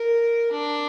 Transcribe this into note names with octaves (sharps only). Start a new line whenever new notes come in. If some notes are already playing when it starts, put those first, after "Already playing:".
Already playing: A#4
D4